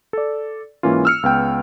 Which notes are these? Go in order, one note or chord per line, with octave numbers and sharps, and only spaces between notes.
A4 D5
G#2 E3 A#3 C#4 F4
E6 F6 C#7
C#2 B3 G5